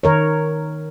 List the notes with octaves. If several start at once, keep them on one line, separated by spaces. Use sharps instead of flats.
D#3 A#4 C#5